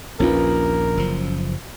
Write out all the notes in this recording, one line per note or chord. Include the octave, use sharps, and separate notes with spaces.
A#1 D#2 C#4 F4 A#4 B4
F#1 F3